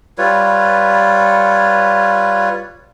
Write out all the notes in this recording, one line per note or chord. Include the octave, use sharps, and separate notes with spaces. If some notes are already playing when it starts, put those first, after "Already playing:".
G3 F4 B4 C#5